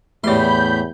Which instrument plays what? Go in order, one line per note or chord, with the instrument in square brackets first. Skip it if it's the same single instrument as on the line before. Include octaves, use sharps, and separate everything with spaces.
[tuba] E2 [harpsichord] A2 C6 [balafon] A3 G4 D5 [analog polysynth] B5 G6